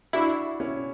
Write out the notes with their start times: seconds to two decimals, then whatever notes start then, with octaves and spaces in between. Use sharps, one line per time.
0.13 D4 E4 F#4
0.60 C#4 E4